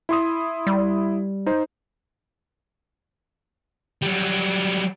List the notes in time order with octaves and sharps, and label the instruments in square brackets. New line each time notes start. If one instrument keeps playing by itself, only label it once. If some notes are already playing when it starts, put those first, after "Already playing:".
[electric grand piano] E4 C6 D#6
[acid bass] G3
[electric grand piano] D#4 C5
[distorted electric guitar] F#3 G3